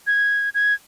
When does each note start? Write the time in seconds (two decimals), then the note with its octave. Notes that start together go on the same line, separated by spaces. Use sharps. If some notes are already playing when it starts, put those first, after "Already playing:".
0.07 G#6
0.55 G#6